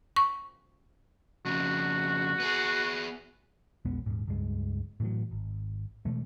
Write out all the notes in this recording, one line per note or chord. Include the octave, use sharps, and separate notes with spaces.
C#6
F2 C#3 F#4
B3 G#4
A#1 E2 G#3 B3
D#1 G#2
C#2 G2 G#3
A2 E3 F#3
G#1
B2 E3 G#3 A3